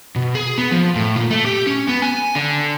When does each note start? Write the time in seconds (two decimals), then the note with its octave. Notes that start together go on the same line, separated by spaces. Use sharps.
0.16 B2
0.35 G#4
0.58 B3
0.71 F3
0.95 A2
1.16 A#2
1.31 A3
1.46 G4
1.67 C#4
1.89 B3
2.02 G#5
2.35 D3